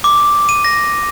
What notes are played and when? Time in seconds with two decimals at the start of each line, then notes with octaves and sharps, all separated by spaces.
0.04 D6
0.49 D#7
0.64 A#6